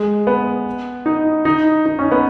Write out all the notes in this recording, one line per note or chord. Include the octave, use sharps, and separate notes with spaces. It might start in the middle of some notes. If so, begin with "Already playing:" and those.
Already playing: G#3
B3
D#4
D#4
D#4
C#4
B3